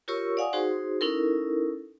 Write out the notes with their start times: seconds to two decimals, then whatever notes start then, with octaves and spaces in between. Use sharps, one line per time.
0.08 F4 G4 A#4 C#5 C#6 E6
0.37 D5 F5 F#5 G#5 C#6 D#6
0.53 D#4 F#4 G#4 C5 C6
1.01 C#4 D#4 E4 A4 A#4